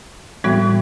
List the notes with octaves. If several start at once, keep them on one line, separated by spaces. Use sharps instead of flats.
A2 E3 G3 B3 F#4